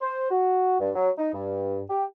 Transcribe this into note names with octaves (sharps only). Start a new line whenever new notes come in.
C5
F#4
G2
F#3
D#4
G2
G4